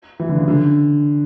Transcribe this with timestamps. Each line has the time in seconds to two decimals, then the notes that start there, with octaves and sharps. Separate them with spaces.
0.20 E3
0.29 D3
0.38 C#3
0.48 D3